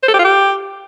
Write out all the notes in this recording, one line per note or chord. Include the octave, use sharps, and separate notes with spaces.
C5
A4
G4
F4
G4